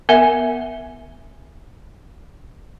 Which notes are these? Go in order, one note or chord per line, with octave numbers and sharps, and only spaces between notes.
B3 A#4 E5 F#5 G#5